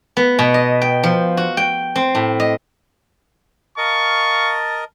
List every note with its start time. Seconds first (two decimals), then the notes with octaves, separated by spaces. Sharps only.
0.17 B3
0.39 B2
0.54 D#5
0.82 G5
1.03 F3
1.37 F#4
1.57 G5
1.96 C4
2.15 A2
2.40 D#5
3.78 A#4 D#5 F5 A5 C#6